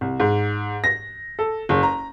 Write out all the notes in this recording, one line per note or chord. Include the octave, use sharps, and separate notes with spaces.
C2
G#2
A#6
A4
F#1
A#5